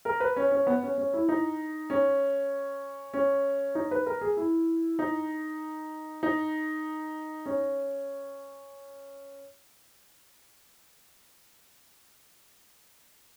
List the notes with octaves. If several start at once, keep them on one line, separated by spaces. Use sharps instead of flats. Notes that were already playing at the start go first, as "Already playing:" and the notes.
A#4
B4
C#4
C#4
B3
C#4
C#4
E4
D#4
C#4
C#4
D#4
B4
A#4
G#4
E4
D#4
D#4
C#4